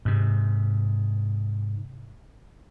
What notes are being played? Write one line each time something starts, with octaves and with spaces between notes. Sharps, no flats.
G#2 C3